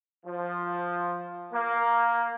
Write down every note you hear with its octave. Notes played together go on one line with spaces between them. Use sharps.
F3
A#3